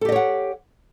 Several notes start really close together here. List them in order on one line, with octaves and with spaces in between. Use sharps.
A4 G4 D#5 C#5 F#5